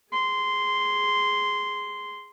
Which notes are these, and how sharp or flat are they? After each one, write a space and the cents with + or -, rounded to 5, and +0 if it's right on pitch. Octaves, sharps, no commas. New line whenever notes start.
G#4 +0 C6 -10